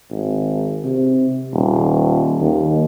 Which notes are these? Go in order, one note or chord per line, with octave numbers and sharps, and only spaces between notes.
G#1
C3
D#1
D#2